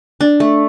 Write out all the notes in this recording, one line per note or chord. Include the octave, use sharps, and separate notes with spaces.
D4
A3